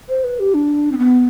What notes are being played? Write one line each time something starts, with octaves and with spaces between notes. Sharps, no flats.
C5
B4
G4
D4
C4
B3